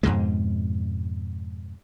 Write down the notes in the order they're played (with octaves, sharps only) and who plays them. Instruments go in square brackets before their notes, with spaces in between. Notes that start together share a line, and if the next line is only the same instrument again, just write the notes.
[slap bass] F2 G#2 B2 G#3